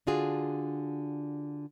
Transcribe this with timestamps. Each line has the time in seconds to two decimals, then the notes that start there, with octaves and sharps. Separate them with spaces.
0.07 D3 D4 F4 F#4 G#4